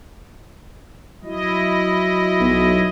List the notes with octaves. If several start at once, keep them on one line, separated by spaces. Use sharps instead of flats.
F#3 E4 D#5
B1